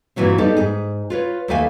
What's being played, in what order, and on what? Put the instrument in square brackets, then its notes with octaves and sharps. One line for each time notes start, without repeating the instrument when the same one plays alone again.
[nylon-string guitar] G2 A#2 E3 F#3 C4
G3 B3 D#4 A4
G#2 G#4
F4 B4 C#5
D#2 A3 A4 B4 F5 G#5